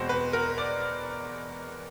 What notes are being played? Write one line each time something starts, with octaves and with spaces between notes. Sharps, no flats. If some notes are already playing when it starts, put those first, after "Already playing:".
Already playing: E2 B2 G#3 C4 C5
B4
A#4
D5